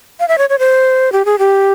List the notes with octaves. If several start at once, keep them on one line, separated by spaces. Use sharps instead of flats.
F5
E5
C#5
C#5
C5
G4
G#4
G4